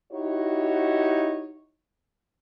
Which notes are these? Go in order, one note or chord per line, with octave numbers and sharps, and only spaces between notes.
D#4 E4 F#4 G4 C#5